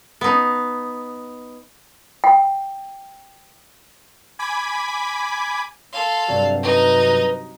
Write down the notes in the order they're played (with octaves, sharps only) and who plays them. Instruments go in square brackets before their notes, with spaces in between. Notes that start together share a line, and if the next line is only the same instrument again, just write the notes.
[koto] B3 D#4
[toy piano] G5
[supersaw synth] G#5 B5 D6 G#6 B6
[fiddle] A4 F5 [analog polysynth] C6
[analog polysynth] G2 C3 F#3 [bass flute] D5
[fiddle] D#4 [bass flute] B4